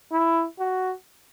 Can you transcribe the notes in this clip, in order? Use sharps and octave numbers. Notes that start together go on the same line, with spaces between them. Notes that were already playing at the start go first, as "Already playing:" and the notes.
E4
F#4